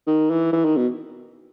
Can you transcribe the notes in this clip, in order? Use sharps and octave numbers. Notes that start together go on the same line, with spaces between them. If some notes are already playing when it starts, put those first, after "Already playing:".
D#3
E3
E3
D#3
B2